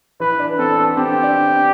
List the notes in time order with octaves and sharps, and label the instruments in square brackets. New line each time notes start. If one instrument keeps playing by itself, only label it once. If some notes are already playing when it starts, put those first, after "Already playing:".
[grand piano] E3 [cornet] B4
[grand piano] D4
[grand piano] C4 [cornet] A4
[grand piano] B3
[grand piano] C4 [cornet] G4
[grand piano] D4
D4